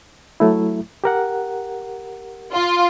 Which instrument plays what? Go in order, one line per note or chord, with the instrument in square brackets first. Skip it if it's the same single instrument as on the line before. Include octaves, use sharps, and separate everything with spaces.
[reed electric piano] F#3 A3 E4
G4 A#4 F#5
[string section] F4